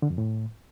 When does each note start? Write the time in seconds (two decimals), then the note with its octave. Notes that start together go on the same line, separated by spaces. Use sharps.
0.02 D3
0.10 F2
0.18 A2